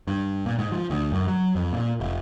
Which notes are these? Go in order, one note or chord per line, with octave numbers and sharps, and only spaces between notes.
G2
A#2
G#2
F3
D2
F#2
F#3
F2
A#2
F1